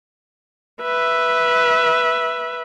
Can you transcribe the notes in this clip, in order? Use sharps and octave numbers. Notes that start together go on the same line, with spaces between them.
B4 E5